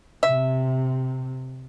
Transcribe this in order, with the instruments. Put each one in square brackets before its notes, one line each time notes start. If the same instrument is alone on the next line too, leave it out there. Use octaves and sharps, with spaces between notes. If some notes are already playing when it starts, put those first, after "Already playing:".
[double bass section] C3 [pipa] E5